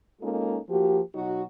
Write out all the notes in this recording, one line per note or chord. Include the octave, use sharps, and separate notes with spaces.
G#3 A#3 C#4 D#4 F4 A4
F3 A#3 F#4 G4
B2 F#3 D#4 F#4